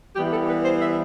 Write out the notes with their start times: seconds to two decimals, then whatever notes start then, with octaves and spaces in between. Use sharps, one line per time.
0.15 E3 G3 B3 G4
0.32 A4
0.48 B4
0.64 C5
0.81 E5